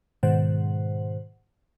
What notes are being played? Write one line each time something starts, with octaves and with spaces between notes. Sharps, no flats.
G#2 B2 D#3 C5 F#5